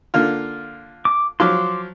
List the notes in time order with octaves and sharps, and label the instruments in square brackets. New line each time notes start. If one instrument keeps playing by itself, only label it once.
[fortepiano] D3 A#3 F4
[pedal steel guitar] D6
[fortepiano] F3 F#3 [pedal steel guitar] C6 D6